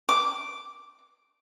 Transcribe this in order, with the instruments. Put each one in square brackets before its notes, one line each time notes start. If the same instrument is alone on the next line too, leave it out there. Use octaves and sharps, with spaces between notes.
[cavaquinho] D6